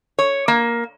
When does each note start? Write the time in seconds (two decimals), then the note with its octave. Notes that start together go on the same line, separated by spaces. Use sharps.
0.19 C#5
0.48 A#3